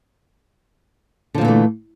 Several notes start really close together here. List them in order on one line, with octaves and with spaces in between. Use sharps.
D3 F3 A#2 E3 A3